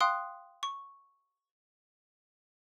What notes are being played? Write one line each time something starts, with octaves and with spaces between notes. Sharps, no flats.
F5 G5 C6 D#6 F#6
C#6